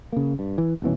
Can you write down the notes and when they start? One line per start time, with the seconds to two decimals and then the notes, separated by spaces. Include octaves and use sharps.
0.12 C#3 A#3
0.39 G2
0.58 E3
0.82 D#1 B2 E3 C#4